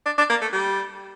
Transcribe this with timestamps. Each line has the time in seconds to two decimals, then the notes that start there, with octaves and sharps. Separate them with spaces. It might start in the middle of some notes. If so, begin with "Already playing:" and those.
0.06 D4
0.18 D4
0.29 A#3
0.41 A3
0.52 G3